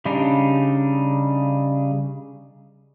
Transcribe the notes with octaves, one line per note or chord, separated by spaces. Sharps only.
C#3 G3 D4 D#4